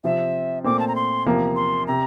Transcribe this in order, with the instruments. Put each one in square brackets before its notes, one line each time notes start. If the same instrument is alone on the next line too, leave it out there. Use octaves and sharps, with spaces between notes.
[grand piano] C3 F3 C4 [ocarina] E5
[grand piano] A#2 A3 C4 [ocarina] D6
[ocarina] A5
A#5
C6
[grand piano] E2 C3 F3 A#3
[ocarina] C6
[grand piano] C3 [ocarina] A#5